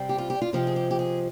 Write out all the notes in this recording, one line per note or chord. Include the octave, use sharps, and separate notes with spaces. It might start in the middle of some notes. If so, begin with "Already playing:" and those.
Already playing: C3 G3 C4
G4
F4
G4
F4
C3 F3 G#3 C4 F4
G#4
G4
G4
G#4